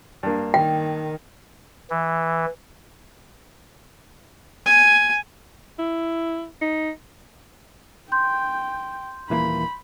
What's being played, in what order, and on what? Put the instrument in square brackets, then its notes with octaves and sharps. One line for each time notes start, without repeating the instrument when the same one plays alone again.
[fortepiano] G2 A#3
[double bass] D#3 [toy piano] G5
[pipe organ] E3
[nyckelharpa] G#5
[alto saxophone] E4
D#4
[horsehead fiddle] G5 [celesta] C6 G6
[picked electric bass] D#1 E3 A#3 [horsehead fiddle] B5